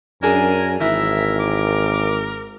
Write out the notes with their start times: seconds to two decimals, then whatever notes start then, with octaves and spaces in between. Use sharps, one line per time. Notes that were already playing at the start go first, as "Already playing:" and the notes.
0.23 F#2 D4 G#4 A#4 G#5
0.80 G#1 E3 E4 A#4 E5
1.40 D6